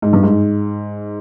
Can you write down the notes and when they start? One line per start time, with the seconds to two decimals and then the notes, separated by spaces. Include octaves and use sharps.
0.02 G#2
0.13 G2
0.23 G#2